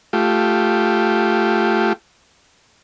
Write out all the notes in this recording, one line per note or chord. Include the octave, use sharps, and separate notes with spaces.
A3 F4 G4